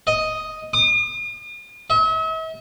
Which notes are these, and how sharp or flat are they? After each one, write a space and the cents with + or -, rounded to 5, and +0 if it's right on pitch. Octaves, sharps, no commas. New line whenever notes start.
D#5 +5
D#6 -45
E5 -45